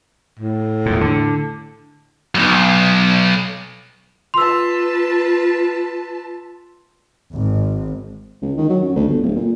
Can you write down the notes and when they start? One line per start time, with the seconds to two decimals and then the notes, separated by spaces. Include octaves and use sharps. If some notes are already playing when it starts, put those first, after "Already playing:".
0.39 A2
0.86 E2 A#2
1.01 D3
2.35 B1 F#2
4.34 F4 B4 A5 C6 E6
7.32 G#1
8.42 C#2
8.58 D#3
8.70 F#3
8.83 F#2
8.96 D2
9.08 G1
9.23 D1
9.36 A#2